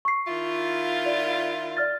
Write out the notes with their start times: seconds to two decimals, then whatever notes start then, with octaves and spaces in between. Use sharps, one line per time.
0.05 C#6 C7
0.27 D#3 E4 F4
1.06 D5
1.77 D5 F6 A6